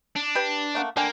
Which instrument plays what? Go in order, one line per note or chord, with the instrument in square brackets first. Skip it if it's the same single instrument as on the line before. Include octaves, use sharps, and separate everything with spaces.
[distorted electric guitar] D4
[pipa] G4 B4
A3 A#3 F#5
[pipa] D3 G5 G#5 [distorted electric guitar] A#3